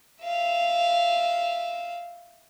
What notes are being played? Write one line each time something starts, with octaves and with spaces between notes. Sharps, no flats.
E5 F5